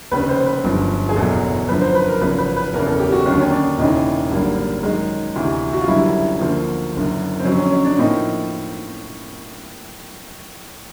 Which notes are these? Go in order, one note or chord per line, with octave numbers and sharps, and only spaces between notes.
F1 D#2 C#3 B4
C5
B4
G1 F#2 D3 F3
G#4
F#1 E2 B2 F#3 A4
F#2 D3 F3 B4
C5
B4
A#4
G#1 F#2 C#3 F3 B4
B4
B4
F#1 E2 C#3 A#4
A4
G4
F#4
D#2 D3 F#3 C#4
C#4
D4
E1 D#2 C#3 E3 D#4
G#1 F#2 D3 G3 A#3
F#2 D#3 G#3
D2 C3 E3
F#4
F4
F#1 F#2 D3 G3 E4
D2 D3 F3 A#3
F#1 F#2 D3
C4
F2 D3 F#3 C#4
C#4
C#4
D4
A2 F3 A#3 D#4